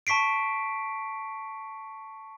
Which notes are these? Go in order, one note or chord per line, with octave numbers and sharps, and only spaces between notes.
A5 C#6 B6 C7 D7